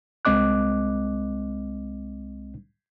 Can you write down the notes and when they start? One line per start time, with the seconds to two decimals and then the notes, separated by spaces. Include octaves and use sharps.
0.25 C2 G#3 C4 D#5 D6 F#6